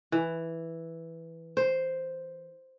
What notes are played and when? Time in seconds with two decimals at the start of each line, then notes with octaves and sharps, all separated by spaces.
0.12 E3
1.57 C5